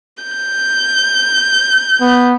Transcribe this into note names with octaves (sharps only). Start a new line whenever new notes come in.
G6
B3